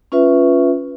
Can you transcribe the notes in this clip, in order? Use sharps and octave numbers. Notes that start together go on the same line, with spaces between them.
C#4 F4 B4 E5